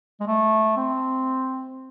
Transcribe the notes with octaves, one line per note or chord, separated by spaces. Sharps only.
G#3
A3
C4